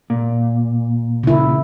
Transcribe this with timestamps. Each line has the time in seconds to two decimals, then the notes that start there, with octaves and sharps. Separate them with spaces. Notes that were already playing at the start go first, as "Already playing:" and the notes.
0.10 A#2
1.23 C#3 E4